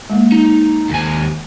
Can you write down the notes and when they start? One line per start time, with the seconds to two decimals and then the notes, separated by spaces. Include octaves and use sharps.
0.10 G#3 A#3
0.32 D#4
0.90 D#2 G#5